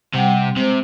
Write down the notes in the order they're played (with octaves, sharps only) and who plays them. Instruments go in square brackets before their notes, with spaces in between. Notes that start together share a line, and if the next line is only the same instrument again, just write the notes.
[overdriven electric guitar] C3 [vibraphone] G3 F#5 G5
[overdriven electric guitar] C3 [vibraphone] G#3 C5